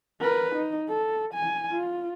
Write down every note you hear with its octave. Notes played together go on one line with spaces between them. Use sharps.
A#4 B4
D#4
A4
G#5
F4